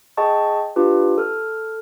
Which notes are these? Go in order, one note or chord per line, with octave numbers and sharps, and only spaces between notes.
G#4 D#5 G5 A5 C#6
D4 F4 G4 B4
A4 F6